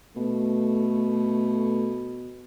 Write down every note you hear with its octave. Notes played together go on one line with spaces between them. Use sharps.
B2 A3